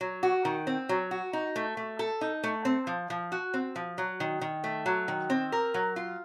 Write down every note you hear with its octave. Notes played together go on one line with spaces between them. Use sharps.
F#3
F#4
D#3
C4
F#3
F#4
D#4
A3
A3
A4
D#4
A3
C4
F3
F3
F#4
C4
F3
F#3
D#3
D#3
A3
F#3
D#3
C4
A#4
F#3
F4